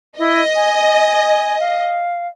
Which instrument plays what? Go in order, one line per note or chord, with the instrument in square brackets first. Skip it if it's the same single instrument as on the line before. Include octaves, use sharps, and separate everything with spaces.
[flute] E4 [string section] D#5
[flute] G#5
F5